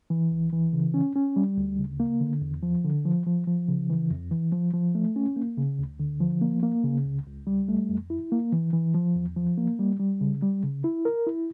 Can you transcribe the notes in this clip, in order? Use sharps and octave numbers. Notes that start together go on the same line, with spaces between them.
E3
C#2
E3
C#3
C#4
C#4
G3
D2
C#3
A#3
D3
E2
F3
D3
F3
F3
F3
C#3
E3
F2
E3
F3
F3
A3
C#4
A#3
C#3
D2
D3
F3
A#3
A#3
C#3
C#2
C#2
G3
A3
F2
E4
A#3
E3
E3
F3
E2
F3
A#3
G3
G3
C#3
G3
C#3
E4
A#4
E4